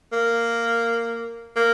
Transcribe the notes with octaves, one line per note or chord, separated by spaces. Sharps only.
A#3
A#3